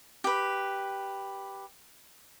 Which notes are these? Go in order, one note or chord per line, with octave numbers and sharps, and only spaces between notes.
G4 B4